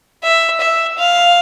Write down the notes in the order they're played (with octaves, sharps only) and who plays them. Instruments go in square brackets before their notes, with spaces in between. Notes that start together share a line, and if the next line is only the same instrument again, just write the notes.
[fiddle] E5
E5
F5